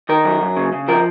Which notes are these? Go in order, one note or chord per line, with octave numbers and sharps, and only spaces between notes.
D#3 A#4
F#2
F#2
C#3
C#3
F3 A#4